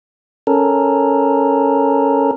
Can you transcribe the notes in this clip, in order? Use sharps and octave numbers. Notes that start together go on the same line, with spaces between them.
C#4 A4 A#4